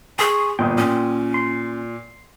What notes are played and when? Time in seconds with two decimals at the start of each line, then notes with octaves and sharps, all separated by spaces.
0.19 G#4 G#5 C6 C#6
0.59 G1 A#2 G5 C6 D#6
0.78 A#2 C#4
1.34 C6